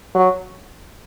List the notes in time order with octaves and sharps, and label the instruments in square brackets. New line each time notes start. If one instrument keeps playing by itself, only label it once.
[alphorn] F#3